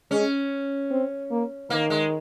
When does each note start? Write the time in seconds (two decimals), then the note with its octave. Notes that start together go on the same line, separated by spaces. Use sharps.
0.11 G#3 C#4
0.91 C4
1.31 A#3
1.70 D#3 A#3
1.90 G#3